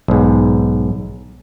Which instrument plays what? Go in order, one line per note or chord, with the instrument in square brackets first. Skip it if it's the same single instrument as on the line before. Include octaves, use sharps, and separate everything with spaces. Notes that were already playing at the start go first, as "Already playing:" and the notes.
[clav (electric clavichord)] B1 G#2